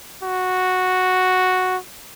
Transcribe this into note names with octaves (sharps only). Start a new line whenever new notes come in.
F#4